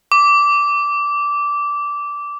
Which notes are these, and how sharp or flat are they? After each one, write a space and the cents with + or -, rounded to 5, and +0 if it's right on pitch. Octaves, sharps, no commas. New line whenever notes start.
D6 -15